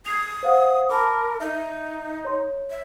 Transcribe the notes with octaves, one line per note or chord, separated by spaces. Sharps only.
D#6 G#6 C7 F7
C5 F5 F#5
A#4 A5 B5 D6
D#4 E5
C#5 C6
E5